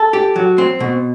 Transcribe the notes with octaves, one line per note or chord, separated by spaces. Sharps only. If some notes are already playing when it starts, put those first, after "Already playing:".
Already playing: A4
G4
F#3
C4
B2